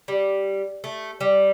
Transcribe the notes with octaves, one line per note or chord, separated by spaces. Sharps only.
G3
A3
G3